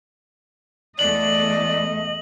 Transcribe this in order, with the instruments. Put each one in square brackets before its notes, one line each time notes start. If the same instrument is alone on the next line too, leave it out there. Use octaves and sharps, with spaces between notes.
[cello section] E2 A3 [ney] D5 [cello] D#5 [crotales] F#7